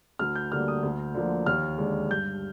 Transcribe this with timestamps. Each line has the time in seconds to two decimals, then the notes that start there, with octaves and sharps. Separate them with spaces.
0.19 D2 F6
0.35 G6
0.52 D3 G3 A#3 F6
0.68 D#6
0.83 D2
1.15 D3 F3 A#3
1.46 D#2 F6
1.78 D3 G#3 D4
2.10 G2 G6